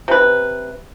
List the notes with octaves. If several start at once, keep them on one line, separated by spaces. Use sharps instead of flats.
C3 B4